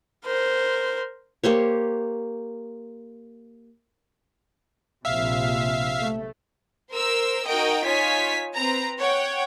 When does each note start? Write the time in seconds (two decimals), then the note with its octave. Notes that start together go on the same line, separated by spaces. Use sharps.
0.25 A#4 C5
1.44 A#3 G4 C5 C#5
5.05 A#1 C3 E5 F5
6.00 A3
6.93 A#4 C5 E6
7.47 D#4 F#4 A#4 D#5 G5
7.85 D#4 F4 C#5 G#5 B6
8.55 C4 B4 A#5
8.99 C#5 F#5 G5